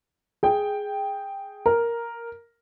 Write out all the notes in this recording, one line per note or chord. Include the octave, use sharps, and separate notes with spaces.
G#4 G5
A#4